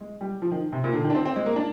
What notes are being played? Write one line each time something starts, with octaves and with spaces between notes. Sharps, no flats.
G#3
G3
F3
D#3
C3
A#2
D3
D#3
D4
C4
C4
G#3
A#3
D4